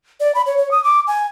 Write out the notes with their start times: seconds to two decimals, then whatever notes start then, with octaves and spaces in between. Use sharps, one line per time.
0.20 D5
0.35 B5
0.46 C#5
0.58 C#5
0.71 D#6
0.84 D6
1.07 G#5